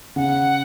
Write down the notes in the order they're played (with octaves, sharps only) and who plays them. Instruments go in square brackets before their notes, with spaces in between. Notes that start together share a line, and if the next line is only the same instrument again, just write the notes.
[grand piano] C#3 [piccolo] F#5